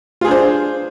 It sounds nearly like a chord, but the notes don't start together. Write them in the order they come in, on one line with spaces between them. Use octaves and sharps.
F4 G#4 D4 C5